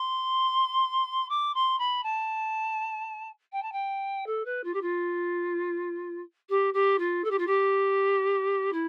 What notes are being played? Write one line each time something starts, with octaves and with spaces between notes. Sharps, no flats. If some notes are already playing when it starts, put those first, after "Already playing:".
Already playing: C6
D6
C6
B5
A5
G5
A5
G5
A4
B4
F4
G4
F4
G4
G4
F4
A4
G4
F4
G4
E4